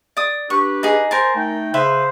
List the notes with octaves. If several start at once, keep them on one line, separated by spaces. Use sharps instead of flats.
D5 D#6
D4 G4 B4 C#6
D#4 G#4
A#4 C5 G#5 A5
A3 D#4 G5
C#3 B4 C5 E5 C6